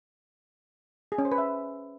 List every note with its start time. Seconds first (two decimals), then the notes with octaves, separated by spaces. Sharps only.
1.12 G#4
1.18 C#4
1.25 C5
1.32 B4
1.38 E5